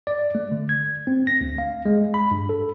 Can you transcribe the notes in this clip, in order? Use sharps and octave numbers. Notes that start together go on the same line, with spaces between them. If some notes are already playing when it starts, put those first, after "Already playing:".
D5
A3
D3
G#6
C4
A#6
D2
F5
G#3
B5
G2
A4